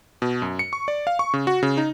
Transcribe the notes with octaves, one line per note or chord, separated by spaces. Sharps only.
B2
F#2
C#7
C#6
D5
F5
C#6
C#3
F#4
C#3
D#4